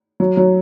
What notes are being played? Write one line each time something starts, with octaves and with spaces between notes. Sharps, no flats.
F#3
F#3